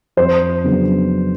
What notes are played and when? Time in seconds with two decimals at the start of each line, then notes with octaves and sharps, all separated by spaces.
0.17 F2 C5
0.64 C#3 F#3 B3 D4